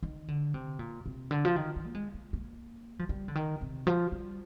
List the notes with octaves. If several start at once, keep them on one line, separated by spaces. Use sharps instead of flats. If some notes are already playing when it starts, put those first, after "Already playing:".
D#3
D3
C3
A#2
C3
D3
F3
D#3
D#3
A#3
G#3
A#3
A#3
F3
G3
D3
D#3
C3
F3
G3